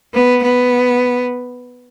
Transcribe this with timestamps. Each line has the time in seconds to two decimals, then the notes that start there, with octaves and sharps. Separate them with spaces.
0.14 B3
0.43 B3